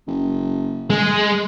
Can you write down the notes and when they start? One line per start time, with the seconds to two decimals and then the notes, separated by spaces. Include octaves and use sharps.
0.07 F#1
0.90 G#3